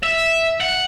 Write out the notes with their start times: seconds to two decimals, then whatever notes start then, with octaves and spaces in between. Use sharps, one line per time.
0.03 E5
0.60 F#5